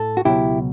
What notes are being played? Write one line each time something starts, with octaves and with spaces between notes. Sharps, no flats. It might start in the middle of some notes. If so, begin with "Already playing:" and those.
Already playing: A2 A4
F#4
C#2 B2 F#3 E4 G4